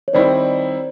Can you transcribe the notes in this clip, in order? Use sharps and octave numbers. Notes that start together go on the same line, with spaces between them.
C#5
D#3 G3 C4 E4 C5 D5